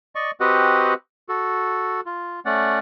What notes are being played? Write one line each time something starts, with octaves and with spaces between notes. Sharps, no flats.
D5 D#5 C#6
C4 F#4 G4 B4 D#5 F#5
F#4 A4
F4
A3 C#4 D5 F#5